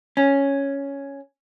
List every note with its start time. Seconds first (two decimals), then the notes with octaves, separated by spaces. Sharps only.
0.17 C#4